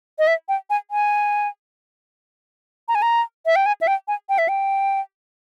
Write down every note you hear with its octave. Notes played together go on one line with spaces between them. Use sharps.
D#5
E5
G5
G#5
G#5
A#5
G#5
A#5
E5
G5
G#5
E5
G5
G#5
G5
E5
G5